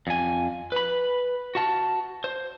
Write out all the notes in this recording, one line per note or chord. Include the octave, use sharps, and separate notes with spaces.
F2 G#5
B4 B5
F#4 A5
C5